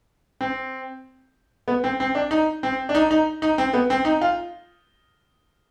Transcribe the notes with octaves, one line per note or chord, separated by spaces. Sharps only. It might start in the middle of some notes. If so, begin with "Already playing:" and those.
C4
B3
C4
C4
D4
D#4
C4
D4
D#4
D#4
D#4
C4
B3
C4
D#4
F4